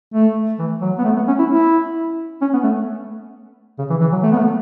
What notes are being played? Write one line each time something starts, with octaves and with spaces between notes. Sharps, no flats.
A3
E3
F#3
B3
A3
B3
C#4
E4
E4
C#4
B3
A3
C#3
E3
E3
F#3
A3
B3
A3